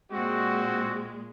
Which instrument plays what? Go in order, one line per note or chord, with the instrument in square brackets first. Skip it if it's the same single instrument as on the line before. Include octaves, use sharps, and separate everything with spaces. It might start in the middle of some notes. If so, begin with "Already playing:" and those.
[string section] A#2 G#3 [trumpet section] C4 F#4